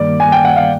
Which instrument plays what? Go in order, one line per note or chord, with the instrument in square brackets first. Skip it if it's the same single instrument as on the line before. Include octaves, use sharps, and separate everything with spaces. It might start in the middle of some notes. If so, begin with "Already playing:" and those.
Already playing: [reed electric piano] G2 D#3 G3 A#3 [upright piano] D5
[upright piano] G#5
G5
F#5
F5